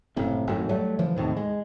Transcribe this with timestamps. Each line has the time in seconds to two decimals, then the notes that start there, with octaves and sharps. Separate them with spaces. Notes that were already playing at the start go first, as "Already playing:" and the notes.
0.16 F#1 A2 C3
0.47 G#1 F#2 A2 F#3
0.69 F#3 G3 A3
0.99 C#3 E3 F3
1.16 D#2 A2 C3 D#3
1.37 G#3